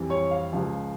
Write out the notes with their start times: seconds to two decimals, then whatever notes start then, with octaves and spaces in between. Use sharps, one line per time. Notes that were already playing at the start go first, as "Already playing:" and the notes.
Already playing: F2 E3 G3
0.10 C#5
0.31 F5
0.53 C#2 C#3 F3